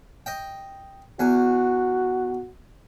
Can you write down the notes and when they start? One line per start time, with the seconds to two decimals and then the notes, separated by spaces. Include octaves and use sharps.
0.26 D#5 G5
1.19 E2 F#4 G#5